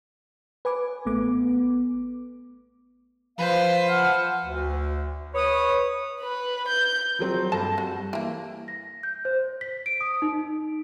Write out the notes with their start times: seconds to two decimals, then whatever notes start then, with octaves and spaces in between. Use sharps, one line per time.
0.65 B4 G#5 D6
1.06 A1 A3 B3 D6
3.38 F3 B4 C5 F5
3.87 F#5 A5 F6
4.43 D2
5.34 B4 C#5 D#6
6.21 B4
6.68 G6
7.19 F3 F#3 C4
7.52 G2 A4 A5 A#6
7.78 G3 F#4
8.13 E3 A#3
8.68 A#6
9.03 G6
9.25 C5
9.61 B6
9.86 D7
10.01 D#6
10.22 D#4